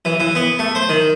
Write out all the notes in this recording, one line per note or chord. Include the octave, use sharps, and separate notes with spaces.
E3
E3
B3
A3
C5
D#3